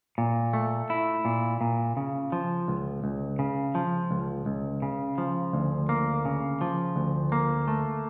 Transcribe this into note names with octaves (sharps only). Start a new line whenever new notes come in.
A#2
A3
E4
A#2
A#2
C#3
F3
C#2
C#2
C#3
F3
C#2
C#2
C#3
F3
D2
A#3
C#3
F3
D2
A#3
A3